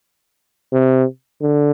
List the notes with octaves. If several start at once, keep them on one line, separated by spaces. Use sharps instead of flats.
C3
D3